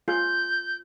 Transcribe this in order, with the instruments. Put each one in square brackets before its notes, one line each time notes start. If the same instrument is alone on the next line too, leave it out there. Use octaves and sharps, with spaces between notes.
[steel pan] F4 G#4 [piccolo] G6